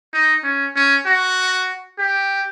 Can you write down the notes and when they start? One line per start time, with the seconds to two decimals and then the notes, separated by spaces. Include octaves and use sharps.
0.13 D#4
0.44 C#4
0.75 C#4
1.06 F#4
1.99 G4